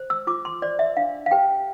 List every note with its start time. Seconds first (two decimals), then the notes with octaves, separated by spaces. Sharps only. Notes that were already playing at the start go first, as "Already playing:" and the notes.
Already playing: C5
0.10 E6
0.27 F4 D6
0.45 C6
0.62 C5 D5
0.79 E5
0.97 D4 F5
1.26 F5
1.31 G4 B4 G5